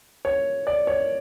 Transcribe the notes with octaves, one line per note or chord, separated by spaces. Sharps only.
C#5
D5
C#5